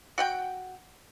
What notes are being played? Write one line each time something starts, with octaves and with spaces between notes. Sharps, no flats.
F#4 F#5 G5